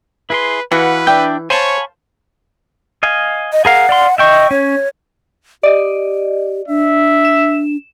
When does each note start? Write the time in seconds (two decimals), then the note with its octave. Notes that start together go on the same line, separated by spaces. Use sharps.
0.30 E4 G#4 B4 C6
0.72 E3 F#4 B4 F5 F#5 G#5
1.07 D4 D5 E5 G5 G6
1.50 C5 C#5 F5 G#5 A5 B5 C#6
3.03 D#5 F5 G#5
3.52 D#5
3.65 G#4 A#4 F5 F#5
3.89 D5 F5 C6
4.18 D#5 E5 G5 C#6
4.51 C#4 C#5
5.63 G4 D5 D#5
6.68 D4 E5
7.25 E7